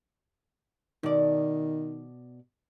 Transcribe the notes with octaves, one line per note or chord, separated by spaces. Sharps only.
B2 D#3 D5